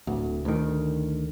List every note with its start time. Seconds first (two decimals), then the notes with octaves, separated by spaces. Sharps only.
0.07 D1 D2
0.45 D2 D#3